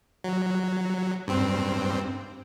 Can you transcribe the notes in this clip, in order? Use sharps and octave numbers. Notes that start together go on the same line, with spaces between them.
F#3
G2 C4